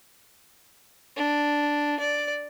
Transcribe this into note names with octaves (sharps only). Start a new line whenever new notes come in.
D4
D5